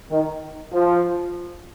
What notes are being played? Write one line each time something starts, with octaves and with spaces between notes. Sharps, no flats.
D#3
F3